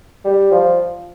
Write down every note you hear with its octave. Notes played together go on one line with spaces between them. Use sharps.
G3
F3